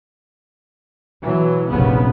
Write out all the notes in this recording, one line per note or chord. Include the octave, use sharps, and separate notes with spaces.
B2 E3 F#3
F1 A#1 F#2 C#3 B3